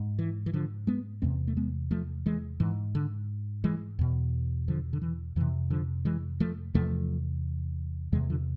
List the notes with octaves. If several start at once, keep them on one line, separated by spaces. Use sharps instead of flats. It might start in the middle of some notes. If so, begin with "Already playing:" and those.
Already playing: G#2
E3
E3
D3 F3
G#3 B3
E2 C3 A3 C4
A3
G#3 B3
F3 A3
E3 G#3
G#2 E3
D3
E3 G#3
E2 B2
D3 F3
D3
E3
F2 C3 E3
D3 F3
E3 G#3
F3 A3
E2 C3 F3 A3
E2 C3 E3 G#3
D3 F3